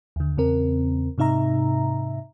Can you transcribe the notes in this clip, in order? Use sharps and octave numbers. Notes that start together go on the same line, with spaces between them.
D#2 D3
E2 C#3 C4 A#4
G#2 C3 D#4 E5 A#5